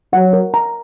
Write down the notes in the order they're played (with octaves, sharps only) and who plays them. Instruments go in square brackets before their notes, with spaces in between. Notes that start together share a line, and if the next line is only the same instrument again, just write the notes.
[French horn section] F#3 [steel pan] F#5
[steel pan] A#4
A#5